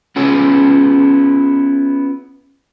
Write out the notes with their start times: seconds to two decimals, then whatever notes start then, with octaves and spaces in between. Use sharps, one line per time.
0.16 B3 C#4 E4 F4 G#4 C#5